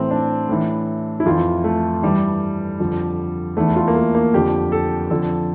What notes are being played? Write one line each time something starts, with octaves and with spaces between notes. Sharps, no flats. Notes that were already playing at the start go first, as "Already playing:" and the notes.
Already playing: A2 E3 C4
D4
A2 E3
E4
F2 E3 F4
A3
G2 E3 G3
F2 D3 F3
E2 E3 A3
F4
A#3
A3
A#3
F2 D3 F3 G4
A4
F2 D3 F3 A4